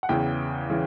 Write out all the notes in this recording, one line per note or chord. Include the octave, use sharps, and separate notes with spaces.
F#5
E2 C#3 E3 G5
C#3 E3